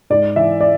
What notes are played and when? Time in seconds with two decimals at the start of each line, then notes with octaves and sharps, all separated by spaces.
0.10 G#2 D5
0.36 E3 E5
0.61 D5